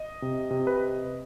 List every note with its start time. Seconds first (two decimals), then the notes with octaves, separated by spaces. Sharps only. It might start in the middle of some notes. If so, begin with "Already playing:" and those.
Already playing: D#5
0.22 C3
0.51 C3
0.67 B4